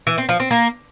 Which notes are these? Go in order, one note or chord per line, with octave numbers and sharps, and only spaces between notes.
E3
C4
F3
C4
A#3